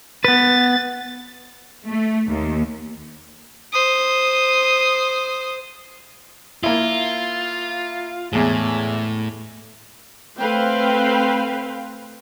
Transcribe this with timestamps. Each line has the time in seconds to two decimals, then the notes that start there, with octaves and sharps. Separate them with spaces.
0.24 B3 B4 A6
1.87 A3
2.28 D#2
3.72 C5 D#6
6.63 A#3 E4 F4
8.33 E2 A2 G#3
10.37 A3 C4 B4 C5 F5 G5